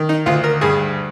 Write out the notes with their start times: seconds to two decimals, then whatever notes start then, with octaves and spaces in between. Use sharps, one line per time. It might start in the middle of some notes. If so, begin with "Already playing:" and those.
Already playing: D#3
0.09 D#4
0.26 D2 F4
0.44 A#4
0.61 G2 G#4